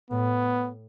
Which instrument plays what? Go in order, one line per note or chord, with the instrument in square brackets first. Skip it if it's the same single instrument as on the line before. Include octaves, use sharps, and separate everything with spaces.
[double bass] A2 [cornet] B3
[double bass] A2